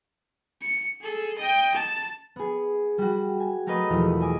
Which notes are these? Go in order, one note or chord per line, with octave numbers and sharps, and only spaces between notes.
C#7
G#4 A4
D#5 G5
A5
B3 G#4
G3 F#4
G#5
F#3 A3 A#4 B4 D#5
E2 B2 F3
D#5 G#5 D6